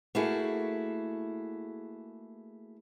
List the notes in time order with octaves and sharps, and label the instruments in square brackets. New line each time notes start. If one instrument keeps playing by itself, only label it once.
[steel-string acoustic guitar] A3 A#3 E4 F#4 G#4